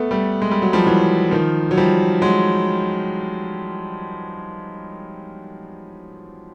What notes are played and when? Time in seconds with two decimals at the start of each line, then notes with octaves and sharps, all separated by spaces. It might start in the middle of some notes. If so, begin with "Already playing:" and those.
Already playing: A3 B3
0.11 G3 A3
0.42 G#3
0.51 G3
0.62 F#3
0.73 F3 G3
0.86 E3 F#3
1.31 D#3 F3
1.71 F#3
1.77 F3 G3
2.22 F#3 G#3